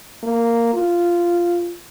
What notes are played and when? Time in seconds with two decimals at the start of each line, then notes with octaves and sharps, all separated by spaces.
0.23 A#3
0.74 F4